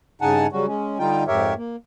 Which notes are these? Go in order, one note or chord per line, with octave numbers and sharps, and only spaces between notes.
G2 C#3 D#4 F#5 G#5 A5
C#3 F#3 G3 C#4 F#4
G#3 C#4
D3 G3 D#4 F4 G5
F2 G#2 G4 A#4 C#5 E5
A#3